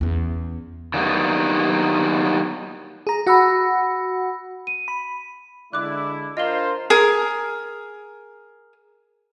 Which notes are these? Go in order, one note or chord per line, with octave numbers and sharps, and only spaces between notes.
E2 C#4
D#3 F#3 G3 A#3 B3 D4
G#4 A#5
F#4 F#5 B5 E6 A#6
D#7
B5
D3 G#3 E4 D5 D6 F#6
D4 F4 A#4 C5 D#5 F5 G7
G#4 A#4